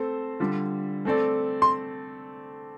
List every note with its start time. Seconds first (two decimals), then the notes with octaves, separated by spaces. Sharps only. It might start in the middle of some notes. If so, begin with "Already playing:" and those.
Already playing: A3 C4 A4 C5
0.40 D3 G3 F4
1.05 A3 C4 A4 D5
1.62 C6